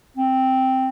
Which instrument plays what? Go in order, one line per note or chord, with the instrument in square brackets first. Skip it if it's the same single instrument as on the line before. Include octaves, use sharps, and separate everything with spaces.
[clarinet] C4